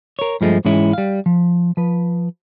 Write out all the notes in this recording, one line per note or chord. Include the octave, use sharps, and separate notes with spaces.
A#4 C#5
G2 F3 G#3 A3
G#2 E3 G#3 C#4 E4
G3 F5
F3
F3 B4